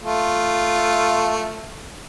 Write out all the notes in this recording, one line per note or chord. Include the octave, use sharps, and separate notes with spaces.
A3 F4